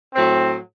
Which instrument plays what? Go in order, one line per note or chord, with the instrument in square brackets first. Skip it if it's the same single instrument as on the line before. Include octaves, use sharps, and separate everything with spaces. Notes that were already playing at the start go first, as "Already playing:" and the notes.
[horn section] A2 F#3 C4